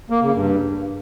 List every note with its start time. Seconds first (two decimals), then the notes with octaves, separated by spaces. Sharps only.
0.10 A#3
0.22 C#3
0.33 G2